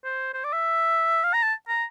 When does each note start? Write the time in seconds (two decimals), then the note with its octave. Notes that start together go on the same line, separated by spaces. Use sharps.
0.04 C5
0.34 C5
0.44 D5
0.53 E5
1.23 F5
1.34 A#5
1.43 A5
1.68 A#5